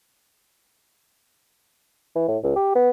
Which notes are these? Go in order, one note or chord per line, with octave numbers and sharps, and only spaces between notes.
E3
A2
C#2
G4
B3